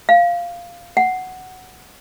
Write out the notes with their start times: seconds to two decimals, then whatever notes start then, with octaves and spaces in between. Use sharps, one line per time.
0.09 F5
0.97 F#5